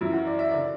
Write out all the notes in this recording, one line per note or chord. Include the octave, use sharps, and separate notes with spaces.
F#2 E3 E4
F#4
D5
E5
D3 D5